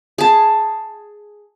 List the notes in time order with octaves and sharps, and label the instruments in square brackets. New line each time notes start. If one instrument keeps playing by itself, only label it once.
[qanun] G#4 A5